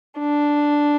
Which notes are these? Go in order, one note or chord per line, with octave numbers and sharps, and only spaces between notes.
D4